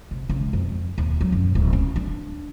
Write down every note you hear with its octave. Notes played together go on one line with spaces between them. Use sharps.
C3
C#2
F2
D#2
F#3
F#2
D1
C#4
D4